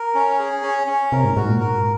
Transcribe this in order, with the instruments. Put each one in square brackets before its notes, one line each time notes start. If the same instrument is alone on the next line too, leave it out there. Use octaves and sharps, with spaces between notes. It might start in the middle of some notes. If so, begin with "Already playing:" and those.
Already playing: [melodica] A#4
C#4
G#4
C#4
C#4
[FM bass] C3 [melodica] A#4
[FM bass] G#2
[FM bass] G#2 [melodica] F#4
[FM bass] A#2
[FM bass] G#2 [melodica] A#4